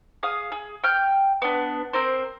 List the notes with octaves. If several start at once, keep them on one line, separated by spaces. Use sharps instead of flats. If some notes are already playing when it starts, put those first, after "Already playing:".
G#4 F5 D#6
G#4
G5 F6 G6
B3 D4
C4 A#4 C5